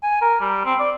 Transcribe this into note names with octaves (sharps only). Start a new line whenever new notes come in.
G#5
A#4
G3
C4
D5